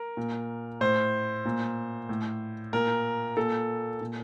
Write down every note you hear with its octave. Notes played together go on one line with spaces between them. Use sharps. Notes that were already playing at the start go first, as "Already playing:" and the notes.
Already playing: A#4
A#2
A2 C5
A#2
A2
A#2 A#4
A#2 A4
A#2